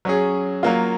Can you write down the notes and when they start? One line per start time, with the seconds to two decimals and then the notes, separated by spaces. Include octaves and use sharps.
0.05 F#3 C#4 G#4
0.63 F#3 A#3 F4